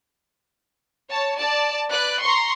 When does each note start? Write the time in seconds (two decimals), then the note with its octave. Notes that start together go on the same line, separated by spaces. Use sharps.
1.09 C#5 A5
1.38 D5 A5
1.89 B4 D5 F#6
2.21 A#5 C6 C#6